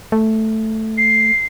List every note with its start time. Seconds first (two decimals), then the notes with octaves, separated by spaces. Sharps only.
0.12 A3
0.98 C7